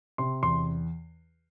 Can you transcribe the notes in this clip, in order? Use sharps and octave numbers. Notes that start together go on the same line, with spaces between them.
C3 C6
E2 C6